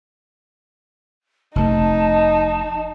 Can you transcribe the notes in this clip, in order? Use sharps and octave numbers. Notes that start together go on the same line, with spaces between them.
F1 C3 A3 D#4 A5